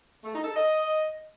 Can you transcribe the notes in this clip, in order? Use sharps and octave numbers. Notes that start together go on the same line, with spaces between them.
A3
D#4
A4
D#5